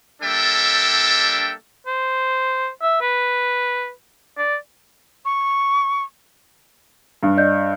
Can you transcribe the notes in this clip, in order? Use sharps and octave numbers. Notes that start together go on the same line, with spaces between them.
G3 A#3 D4 A4 E5 G5
C5
E5
B4
D5
C#6
G2
D5 D#5 G6